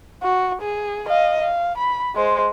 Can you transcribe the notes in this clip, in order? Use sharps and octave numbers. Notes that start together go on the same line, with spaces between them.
F#4
G#4
D#5 F5
F5
B5
G#3 C5